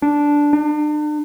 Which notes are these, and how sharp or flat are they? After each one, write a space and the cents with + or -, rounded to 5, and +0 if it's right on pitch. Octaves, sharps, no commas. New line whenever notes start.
D4 -5
D4 +40